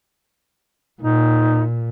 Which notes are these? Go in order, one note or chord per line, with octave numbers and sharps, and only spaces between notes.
A#2 D#4